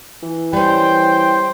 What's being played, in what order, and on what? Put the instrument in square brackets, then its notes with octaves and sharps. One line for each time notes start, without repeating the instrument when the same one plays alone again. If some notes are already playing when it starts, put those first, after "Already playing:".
[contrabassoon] E3
[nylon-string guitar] G3 C#4 [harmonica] C5 [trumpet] G5